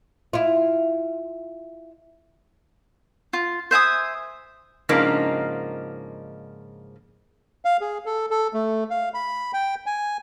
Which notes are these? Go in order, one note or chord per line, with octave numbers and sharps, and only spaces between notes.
E4 F4
F4
C5 E5 G#5 D#6
G#2 C#3 F3 A#3 D4 D#4
F5
G#4
A4
A4
A3
F5
B5
G5
G#5